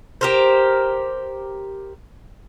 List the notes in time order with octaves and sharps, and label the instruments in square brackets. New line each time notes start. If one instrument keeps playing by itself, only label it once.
[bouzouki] G4 A#4 C5